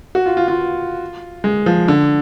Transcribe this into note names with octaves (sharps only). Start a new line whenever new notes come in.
F#4
F4
F4
F4
G#3
F3
D3